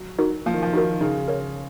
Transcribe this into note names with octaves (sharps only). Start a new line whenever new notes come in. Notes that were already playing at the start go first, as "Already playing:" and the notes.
Already playing: F#3
D#4 F#4 A#4
F3 A#3
D#3
F3
D#3 D#4 F#4 A#4
D#3
C#3 D#4
A#4 C#5